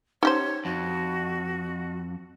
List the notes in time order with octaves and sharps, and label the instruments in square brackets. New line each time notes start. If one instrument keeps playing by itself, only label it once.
[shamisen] C#4 G4 C5 [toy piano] D#4 [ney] C#5
[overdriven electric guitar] F2 [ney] F#4